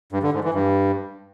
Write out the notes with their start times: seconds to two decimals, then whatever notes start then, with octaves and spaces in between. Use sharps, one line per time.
0.12 G2
0.23 D3
0.33 G#2
0.44 E3
0.54 G2